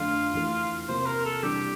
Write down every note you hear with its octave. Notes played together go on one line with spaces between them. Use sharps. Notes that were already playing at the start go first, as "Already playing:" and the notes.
Already playing: F2 D3 F3 A3 D4 F4
E2 E3 A3
C3 F3 A#3 F4 C5
A#4
A4
C3 E3 G3 D4 G4